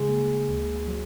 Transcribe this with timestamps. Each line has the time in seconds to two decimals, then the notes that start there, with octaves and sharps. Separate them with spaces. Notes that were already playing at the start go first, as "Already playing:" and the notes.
Already playing: C#3 G#3
0.09 A#3
0.49 D2
0.88 F#3